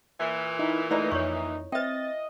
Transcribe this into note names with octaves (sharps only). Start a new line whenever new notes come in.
A#2 E3
D#4 E4
A3 D#4 E4 B4 D5 D#5 A#5
F2 C#5 C#6
C4 B4 D#5 E5 G5 A6